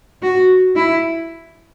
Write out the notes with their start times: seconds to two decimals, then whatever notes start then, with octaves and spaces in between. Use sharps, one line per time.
0.23 F#4
0.76 E4